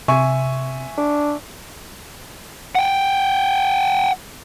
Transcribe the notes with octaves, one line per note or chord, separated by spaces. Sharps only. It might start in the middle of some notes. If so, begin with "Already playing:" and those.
C3 E5 G#5 C#6
D4
F#5 G5